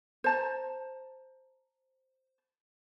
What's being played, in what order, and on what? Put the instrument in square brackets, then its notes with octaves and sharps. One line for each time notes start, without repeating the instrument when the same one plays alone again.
[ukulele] C5 A5 A#5